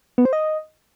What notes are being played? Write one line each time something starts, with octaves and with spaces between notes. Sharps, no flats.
B3
C5
D#5